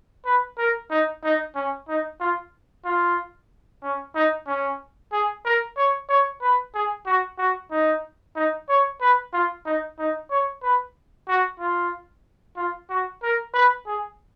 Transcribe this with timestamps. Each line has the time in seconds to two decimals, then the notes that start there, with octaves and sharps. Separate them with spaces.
0.26 B4
0.58 A#4
0.90 D#4
1.24 D#4
1.55 C#4
1.88 D#4
2.20 F4
2.85 F4
3.83 C#4
4.15 D#4
4.47 C#4
5.12 G#4
5.45 A#4
5.77 C#5
6.09 C#5
6.41 B4
6.75 G#4
7.06 F#4
7.38 F#4
7.71 D#4
8.36 D#4
8.69 C#5
9.01 B4
9.33 F4
9.66 D#4
9.99 D#4
10.30 C#5
10.63 B4
11.28 F#4
11.60 F4
12.57 F4
12.90 F#4
13.23 A#4
13.54 B4
13.87 G#4